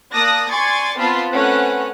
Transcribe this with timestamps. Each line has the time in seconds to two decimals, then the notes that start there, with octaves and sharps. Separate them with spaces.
0.12 A#3 D5 A5 D#6 F#6 A#6
0.50 D5 G#5 C6 C#6 G#6 A6
0.98 B3 C4 F4 A5 B5 C6
1.31 A3 C4 C#4 B4 F#5 F#6